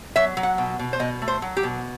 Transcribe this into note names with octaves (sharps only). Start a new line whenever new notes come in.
F#3 E5
F#3
F#5
B2
B2
C5
B2 D#5
A3
C5
F#3
G4
B2